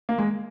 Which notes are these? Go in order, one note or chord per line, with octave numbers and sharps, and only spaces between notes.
A#3
G#3